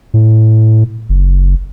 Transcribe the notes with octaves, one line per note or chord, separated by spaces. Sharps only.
A2
F#1